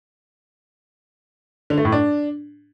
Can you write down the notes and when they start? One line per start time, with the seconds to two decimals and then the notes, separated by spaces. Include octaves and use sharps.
1.70 D3
1.78 A3
1.85 A2
1.92 D4